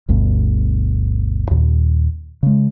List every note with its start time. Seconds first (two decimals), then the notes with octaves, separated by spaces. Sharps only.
0.08 G1 D2 G2 B2
1.51 D#2 A#2
2.43 C#3 G#3